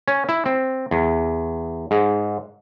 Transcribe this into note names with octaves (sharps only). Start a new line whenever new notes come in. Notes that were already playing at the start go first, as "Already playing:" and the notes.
C#4
E4
C4
E2
G#2